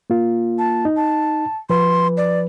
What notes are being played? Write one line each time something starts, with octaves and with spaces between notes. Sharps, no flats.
A#3 F4
A5
D#4
A5
F3 B4 C6
D5